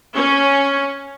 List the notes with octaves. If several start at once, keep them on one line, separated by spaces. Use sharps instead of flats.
C#4